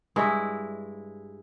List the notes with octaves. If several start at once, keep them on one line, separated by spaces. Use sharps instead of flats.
G2 G#3 E4